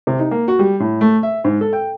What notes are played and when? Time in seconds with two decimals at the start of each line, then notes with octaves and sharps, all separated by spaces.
0.07 C3
0.19 D#4
0.31 A#3
0.48 F#4
0.59 G3
0.80 A2
1.01 A3
1.23 E5
1.44 G#2
1.61 A4
1.73 G5